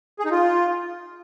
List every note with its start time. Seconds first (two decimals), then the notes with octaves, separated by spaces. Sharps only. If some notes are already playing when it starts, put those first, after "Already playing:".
0.19 G#4
0.25 D#4
0.31 F4